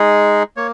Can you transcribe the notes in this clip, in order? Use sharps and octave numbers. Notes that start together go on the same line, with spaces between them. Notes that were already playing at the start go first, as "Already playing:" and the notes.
Already playing: G#3 D#4 G#4
A#3 C#5